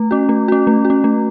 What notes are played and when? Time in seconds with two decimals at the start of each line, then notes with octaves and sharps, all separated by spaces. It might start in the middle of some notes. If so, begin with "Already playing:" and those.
Already playing: A3
0.11 C#4 F#4
0.29 A3
0.48 C#4 F#4
0.67 A3
0.85 F#4
0.90 C#4
1.04 A3